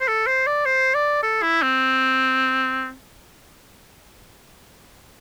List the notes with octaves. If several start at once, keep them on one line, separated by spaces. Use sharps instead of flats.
C5
A4
C5
D5
C5
D5
A4
E4
C4